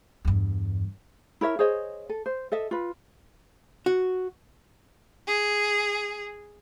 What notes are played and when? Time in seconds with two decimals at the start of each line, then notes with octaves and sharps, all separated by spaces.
0.25 E2 G2
1.41 E4 A#4 C#5 E5
1.59 G#4 C5 C#5 D#5
2.09 A4
2.26 C5
2.52 A4 D#5 E5
2.71 F4 B4
3.86 F#4
5.27 G#4